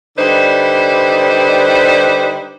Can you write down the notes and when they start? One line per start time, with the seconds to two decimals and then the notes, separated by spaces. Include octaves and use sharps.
0.18 D3 G3 D#4 B4 C5 D5